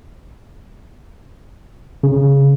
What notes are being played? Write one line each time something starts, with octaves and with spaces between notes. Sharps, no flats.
C#3